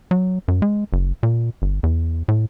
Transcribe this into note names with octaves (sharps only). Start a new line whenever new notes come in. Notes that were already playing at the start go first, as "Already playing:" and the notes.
F#3
F#2
G#3
F#1
A#2
G1
E2
A2